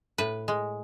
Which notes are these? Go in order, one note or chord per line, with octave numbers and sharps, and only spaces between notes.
A2 B4
G#3